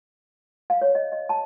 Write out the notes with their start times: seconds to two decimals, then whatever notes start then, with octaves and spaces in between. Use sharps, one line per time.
0.70 F5
0.81 C#5
0.95 D#5
1.12 D#5
1.29 A5